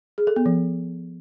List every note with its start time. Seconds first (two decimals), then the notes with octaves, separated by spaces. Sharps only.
0.18 G#4
0.27 A4
0.36 B3
0.46 F3